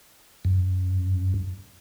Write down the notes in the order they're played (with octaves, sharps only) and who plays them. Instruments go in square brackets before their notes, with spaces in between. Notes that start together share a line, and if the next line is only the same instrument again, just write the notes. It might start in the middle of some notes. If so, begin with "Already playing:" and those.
[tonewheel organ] F#2